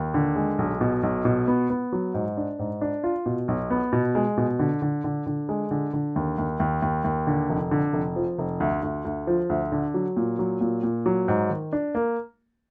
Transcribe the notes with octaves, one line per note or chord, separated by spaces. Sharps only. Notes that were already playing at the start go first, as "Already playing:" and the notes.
Already playing: D#2
D3
G#3
B1
B2
B1
B2
B3
B3
F#3
G#2
D4
G#2
D4
F4
B2
B1
B3
B2
G#3
B2
D3
D3
D3
D3
G#3
D3
D3
D#2
D#2
D#2
D#2
D#2
D3
F1
D3
F1
F3
F1
D2
D2
D2
F3
D2
D3
F#3
A#2
F#3
A#2
A#2
F#3
G#2
D#3
D4
A#3